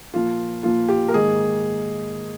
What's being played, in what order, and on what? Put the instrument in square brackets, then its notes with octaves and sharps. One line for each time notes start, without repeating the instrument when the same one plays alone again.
[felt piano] A#2 F3 A#3 F4
A#2 F3 A#3 F4
G4
A#4
G#2 D#3 A#3 G#4